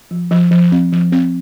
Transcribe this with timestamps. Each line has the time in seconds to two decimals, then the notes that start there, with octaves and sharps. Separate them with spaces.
0.11 F3
0.31 F3
0.51 F3
0.72 C4
0.92 F3
1.12 C4